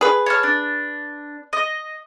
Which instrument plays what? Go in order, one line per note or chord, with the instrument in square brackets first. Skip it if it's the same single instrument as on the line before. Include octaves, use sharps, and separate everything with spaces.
[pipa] G#4 B4
[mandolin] C#5 A5 F6
D4
D#5